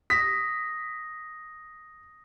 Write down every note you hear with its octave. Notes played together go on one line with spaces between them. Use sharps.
D#6 A#6 B6